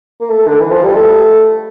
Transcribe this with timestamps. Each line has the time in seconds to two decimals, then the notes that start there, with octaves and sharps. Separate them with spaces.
0.20 A#3
0.30 A3
0.48 D3
0.60 E3
0.71 F3
0.83 G3
0.95 A3